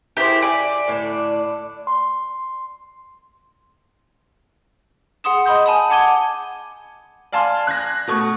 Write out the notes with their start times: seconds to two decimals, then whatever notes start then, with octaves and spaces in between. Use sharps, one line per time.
0.17 E4 G4 G#4 A#4 C5
0.42 D5 G#5
0.88 A2 D3 D4
1.87 C6
5.24 G#4 F#5 C6 D#6 E7
5.46 D#5 B5 C6 D#6 G6
5.66 G#5 A5 B5 D#6
5.90 F#5 A5 D6 G#6 D#7 G7
7.33 D5 F5 G#5 A5 C6
7.67 F#6 G#6 A#6
8.07 B2 A3 C#6